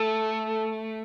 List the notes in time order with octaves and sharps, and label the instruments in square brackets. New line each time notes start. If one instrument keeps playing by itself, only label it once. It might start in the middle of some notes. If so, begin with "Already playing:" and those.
Already playing: [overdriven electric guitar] A3 [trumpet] A4